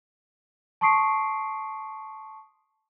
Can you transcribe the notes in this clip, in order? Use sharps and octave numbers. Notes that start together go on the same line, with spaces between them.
A5 C6 C#6 D#6 C7 D7